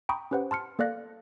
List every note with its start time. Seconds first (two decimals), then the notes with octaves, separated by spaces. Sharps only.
0.09 G5 A#5 B5 C#6 D#6
0.31 C#4 G4 B4 C5 F#5
0.51 A5 C6 F6 C#7
0.79 A#3 A4 D5 F5 F#6 A#6